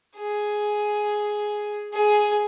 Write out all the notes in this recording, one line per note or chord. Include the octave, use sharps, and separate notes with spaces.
G#4
G#4